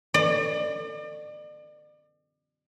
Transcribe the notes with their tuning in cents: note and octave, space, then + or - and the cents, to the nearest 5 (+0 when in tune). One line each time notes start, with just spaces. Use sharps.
D5 +40